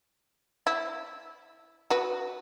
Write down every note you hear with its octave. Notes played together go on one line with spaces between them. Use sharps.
E4
F#4 B4